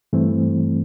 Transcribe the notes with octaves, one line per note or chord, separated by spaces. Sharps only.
G2 E3 A3 C4